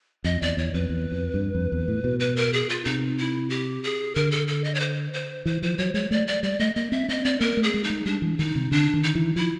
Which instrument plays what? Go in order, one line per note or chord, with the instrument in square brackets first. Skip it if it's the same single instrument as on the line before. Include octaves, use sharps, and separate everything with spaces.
[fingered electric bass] F2 [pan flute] D#5
[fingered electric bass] E2 [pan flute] D5
[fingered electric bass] E2 [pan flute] C#5
[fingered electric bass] F2 [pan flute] B4
[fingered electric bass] E2
F2
G2
F2
E2
A2
B2
[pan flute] B4
A#4
G#4
F4
[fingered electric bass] C3 [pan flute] D#4
[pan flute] E4
G4
G#4
[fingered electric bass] D3 [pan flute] A#4
[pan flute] A4
A4
D#5
C#5
C5
C5
[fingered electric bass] E3 [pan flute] C5
[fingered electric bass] F3 [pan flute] C5
[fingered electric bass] F#3 [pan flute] C#5
[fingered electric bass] G#3 [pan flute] C#5
[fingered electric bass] A3 [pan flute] D5
[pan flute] D5
[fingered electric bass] G3 [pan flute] D5
[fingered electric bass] A3 [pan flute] D#5
[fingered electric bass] A#3 [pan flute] D#5
[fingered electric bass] C4 [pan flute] E5
[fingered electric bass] C4 [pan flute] D#5
[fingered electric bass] C4 [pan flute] D5
[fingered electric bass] A#3 [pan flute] A#4
[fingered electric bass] A3
[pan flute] G#4
[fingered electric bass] G#3
[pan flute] D#4
[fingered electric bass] G#3
[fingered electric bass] G3 [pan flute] D4
[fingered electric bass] E3
[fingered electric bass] D#3 [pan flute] D#4
[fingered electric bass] C3
[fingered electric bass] D3 [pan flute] D4
[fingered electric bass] D#3
[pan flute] D#4
[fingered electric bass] E3
[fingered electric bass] F3 [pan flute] E4